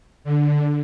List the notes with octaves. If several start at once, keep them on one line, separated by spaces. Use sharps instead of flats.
D3